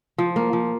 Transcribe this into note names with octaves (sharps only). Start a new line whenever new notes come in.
F3
A#3
F3